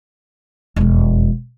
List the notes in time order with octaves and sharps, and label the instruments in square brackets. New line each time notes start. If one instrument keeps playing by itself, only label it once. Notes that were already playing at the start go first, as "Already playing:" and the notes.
[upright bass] E1 F2